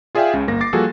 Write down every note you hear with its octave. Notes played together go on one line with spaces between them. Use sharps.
F4 G#4 D5 E5 F5 G5
C#2 C#3
G1 A#3 A#6
D6 A6 C7
F3 G3 A#3 F#4 G#4 A4